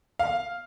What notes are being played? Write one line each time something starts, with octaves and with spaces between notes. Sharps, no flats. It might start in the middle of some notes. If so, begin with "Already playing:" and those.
F5